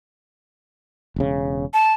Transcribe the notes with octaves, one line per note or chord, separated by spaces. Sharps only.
E1 C#3
A5